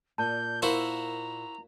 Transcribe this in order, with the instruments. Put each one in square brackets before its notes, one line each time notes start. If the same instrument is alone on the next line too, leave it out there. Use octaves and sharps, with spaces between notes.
[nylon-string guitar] A#2 [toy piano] A5 [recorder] G6
[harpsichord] E4 F#4 C5 [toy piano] A#4 F5 [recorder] A#5